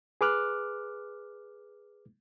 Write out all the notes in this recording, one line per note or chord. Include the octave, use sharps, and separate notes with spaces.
G#4 B4 D6 F6 F#6